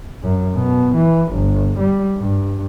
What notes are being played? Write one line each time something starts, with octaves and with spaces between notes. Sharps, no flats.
F#2
B2
E3
G1
G3
G2